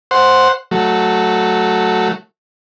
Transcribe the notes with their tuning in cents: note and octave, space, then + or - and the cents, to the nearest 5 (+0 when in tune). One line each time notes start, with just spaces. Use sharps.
C5 +0 F#5 +0
F#3 +0 A3 +0